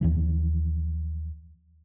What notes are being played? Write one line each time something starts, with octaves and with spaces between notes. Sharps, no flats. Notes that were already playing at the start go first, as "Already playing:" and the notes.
D#2 E3 F3